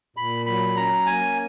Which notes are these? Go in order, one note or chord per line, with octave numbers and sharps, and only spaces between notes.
A#2 B5
F#3 B5
C#4 A#5
A#3 G#5